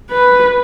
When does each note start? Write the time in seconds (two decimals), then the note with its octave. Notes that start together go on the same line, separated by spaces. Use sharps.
0.11 B4